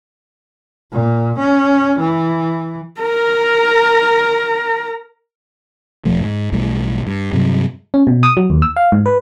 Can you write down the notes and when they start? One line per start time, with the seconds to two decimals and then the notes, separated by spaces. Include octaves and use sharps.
0.92 A#2
1.39 C#4
1.99 E3
3.01 A#4 A#5
6.05 E1 F3 A3
6.20 G#2
6.52 B1 A2 E3 G3
7.07 G2
7.33 G2 C3 F#3
7.94 C#4
8.07 B2
8.23 D#6
8.37 F#3
8.50 D#2
8.62 E6
8.76 F5
8.92 G#2
9.06 B4